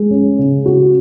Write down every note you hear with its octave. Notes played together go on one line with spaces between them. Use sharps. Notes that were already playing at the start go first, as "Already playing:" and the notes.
Already playing: G#3
C#4
C#3
F#4